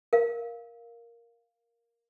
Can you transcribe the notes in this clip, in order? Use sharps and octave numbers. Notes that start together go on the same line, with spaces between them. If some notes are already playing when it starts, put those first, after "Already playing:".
A#4 F5